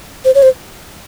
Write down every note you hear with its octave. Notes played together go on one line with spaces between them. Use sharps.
C5
C#5
C5